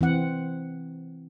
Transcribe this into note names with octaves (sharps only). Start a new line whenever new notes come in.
E3 C4 F#5